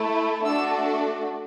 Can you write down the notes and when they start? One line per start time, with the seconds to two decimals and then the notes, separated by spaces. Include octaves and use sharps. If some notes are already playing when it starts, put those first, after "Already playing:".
Already playing: A3 E4 A4
0.45 A3 D4 F#4 A4 E6